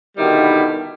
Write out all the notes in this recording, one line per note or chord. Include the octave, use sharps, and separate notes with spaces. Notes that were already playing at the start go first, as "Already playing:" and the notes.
B2 D3 D#3 G3 E4